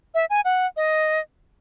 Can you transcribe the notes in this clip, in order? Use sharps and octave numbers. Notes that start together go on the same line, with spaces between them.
E5
G#5
F#5
D#5